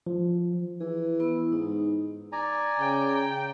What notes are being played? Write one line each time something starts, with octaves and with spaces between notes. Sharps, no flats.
F3
E3 G#4
B3 E4
G#2 D#4
D5 G#5 A#5
C#3 G5